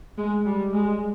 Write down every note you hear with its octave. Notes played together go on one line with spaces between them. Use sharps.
G#3
G3
G#3